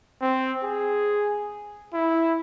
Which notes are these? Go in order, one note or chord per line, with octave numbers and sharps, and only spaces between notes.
C4
G#4
E4